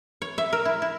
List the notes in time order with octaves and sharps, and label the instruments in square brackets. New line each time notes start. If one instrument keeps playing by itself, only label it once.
[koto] C#5
E5
A#4
E4
E4